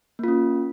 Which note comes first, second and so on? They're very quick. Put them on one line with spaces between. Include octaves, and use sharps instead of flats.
A#3 F4 C#4